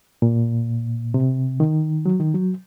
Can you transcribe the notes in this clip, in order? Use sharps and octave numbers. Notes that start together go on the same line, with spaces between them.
A#2
C3
D#3
F#3
D#3
F#3